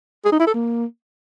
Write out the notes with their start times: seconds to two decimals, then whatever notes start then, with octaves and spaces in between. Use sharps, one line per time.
0.25 G#4
0.32 D#4
0.39 E4
0.47 A4
0.54 A#3